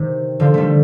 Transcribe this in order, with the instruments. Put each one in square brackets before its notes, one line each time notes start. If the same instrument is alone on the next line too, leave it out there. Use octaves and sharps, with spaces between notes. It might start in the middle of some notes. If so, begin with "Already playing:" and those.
Already playing: [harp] C3 D#3
D3 F3
D#3 G3 A3